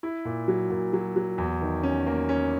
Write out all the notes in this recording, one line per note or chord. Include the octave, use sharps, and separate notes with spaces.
E4
A#2
F#3
A#2
F#3
F#3
E2
D#3
C#4
A#3
C#4